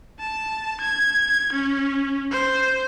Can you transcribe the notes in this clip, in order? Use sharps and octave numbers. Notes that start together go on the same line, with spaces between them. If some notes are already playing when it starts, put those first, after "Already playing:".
A5
G#6
C#4
C5